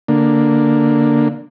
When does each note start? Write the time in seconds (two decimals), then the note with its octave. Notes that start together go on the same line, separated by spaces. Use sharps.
0.08 D3 A#3